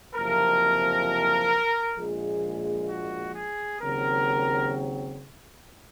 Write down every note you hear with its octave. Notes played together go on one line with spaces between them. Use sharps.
F#1 F2 C3 F3 A#4
A#1 A#2 F3 G#3 G#4
F#4
G#4
D#2 C#3 F#3 C4 A#4